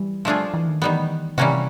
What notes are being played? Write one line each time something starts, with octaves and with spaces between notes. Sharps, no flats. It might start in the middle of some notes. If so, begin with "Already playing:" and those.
Already playing: E3 G3
F3 A3 D4 F4 G#4
E3
D#3
D#3 E3 G3 B3
C3 E3 G3 A#3 C#4 F#4